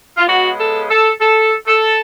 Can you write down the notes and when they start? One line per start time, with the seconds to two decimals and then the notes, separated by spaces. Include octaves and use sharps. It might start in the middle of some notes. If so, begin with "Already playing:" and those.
0.18 F4
0.28 C#3 G#3 B3 F#4
0.59 A4
0.89 A4
1.21 A4
1.68 A4